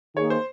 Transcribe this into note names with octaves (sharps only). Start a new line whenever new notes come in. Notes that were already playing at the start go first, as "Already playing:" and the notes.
D#3 A#3 D#4 G#4 C#5
C5